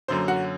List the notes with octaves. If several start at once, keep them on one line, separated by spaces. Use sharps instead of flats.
F#2 D3 F#3 A#3 C5
F#4 F#5